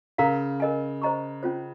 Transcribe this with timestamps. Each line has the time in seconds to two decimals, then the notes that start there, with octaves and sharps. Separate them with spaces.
0.18 C#3 A#4 F5 A#5
0.60 A#4 D#5 G#5
1.02 C5 D#5 A#5 C#6
1.43 C#4 F4 C5